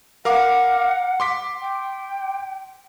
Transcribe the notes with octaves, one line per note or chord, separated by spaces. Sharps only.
A#4 F5 F#5 D6
C6 D6 B6
G5